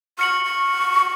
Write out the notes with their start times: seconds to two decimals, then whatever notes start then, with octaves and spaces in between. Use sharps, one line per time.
0.19 C#6 F6 C#7 F#7
0.45 C#6